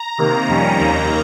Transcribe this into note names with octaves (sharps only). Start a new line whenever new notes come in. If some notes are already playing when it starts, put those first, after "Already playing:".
Already playing: A#5
C3 D#3 A#3
F2 D#3 G3 C#4
D#2 D#3 A#3 A#5